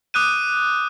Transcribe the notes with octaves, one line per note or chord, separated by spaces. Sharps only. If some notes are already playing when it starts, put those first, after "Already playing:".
D6 D#6 F#6 G6 D#7